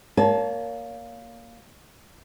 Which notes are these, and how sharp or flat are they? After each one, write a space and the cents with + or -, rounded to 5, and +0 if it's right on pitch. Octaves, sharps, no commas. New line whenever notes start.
A#3 +0 C#5 +35 A5 -20